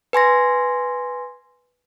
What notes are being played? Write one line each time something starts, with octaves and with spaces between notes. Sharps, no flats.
B4 G#5 C6 A#6